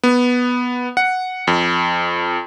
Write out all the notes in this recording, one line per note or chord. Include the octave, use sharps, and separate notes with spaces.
B3
F#5
F2